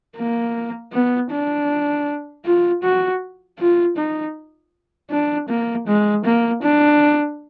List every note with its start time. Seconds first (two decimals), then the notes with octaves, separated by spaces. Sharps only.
0.17 A#3
0.93 B3
1.31 D4
2.45 F4
2.83 F#4
3.59 F4
3.97 D#4
5.11 D4
5.49 A#3
5.87 G#3
6.25 A#3
6.62 D4